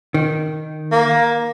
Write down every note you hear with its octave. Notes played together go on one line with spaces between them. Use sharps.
D#3
A#3